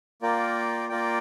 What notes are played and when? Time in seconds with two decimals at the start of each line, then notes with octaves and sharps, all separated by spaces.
0.22 A#3 F4 A#4 D5 G5
0.89 A#3 F4 A#4 D5 G5